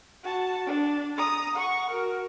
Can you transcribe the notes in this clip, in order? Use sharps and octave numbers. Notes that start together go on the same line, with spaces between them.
F#4 A5
D4
A#5 D#6
F#5 C#6
F#4 A#4